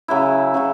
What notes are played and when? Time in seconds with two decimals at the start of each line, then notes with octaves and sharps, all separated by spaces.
0.08 C#3 F#3 E4
0.54 C#3 F#3 E4